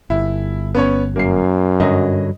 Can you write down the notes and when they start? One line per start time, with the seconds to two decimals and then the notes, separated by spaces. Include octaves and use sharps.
0.10 G1 E4
0.75 B3 C#4 C#5
1.16 F#2 A#3 C7
1.80 G2 D3 F#3 D#5